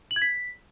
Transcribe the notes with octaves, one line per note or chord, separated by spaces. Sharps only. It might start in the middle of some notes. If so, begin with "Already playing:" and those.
F#7
G#6
B6